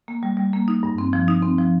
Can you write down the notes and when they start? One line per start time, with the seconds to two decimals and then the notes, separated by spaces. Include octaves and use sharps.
0.08 A#3
0.23 G3
0.37 G3
0.53 A#3
0.68 D#4
0.83 G2
0.98 C4
1.13 F3
1.28 D#4
1.42 C4
1.58 F3